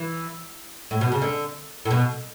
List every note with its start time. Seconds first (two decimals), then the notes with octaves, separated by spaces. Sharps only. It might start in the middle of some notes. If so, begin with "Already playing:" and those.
Already playing: E3
0.91 A2
1.01 B2
1.12 C#3
1.22 D3
1.85 A2
1.91 B2